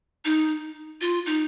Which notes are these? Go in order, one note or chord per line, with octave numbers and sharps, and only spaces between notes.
D#4
F4
D#4